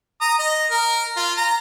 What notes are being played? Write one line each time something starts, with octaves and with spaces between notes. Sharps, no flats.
A#5 D#6
D#5
A#4
F4
A#5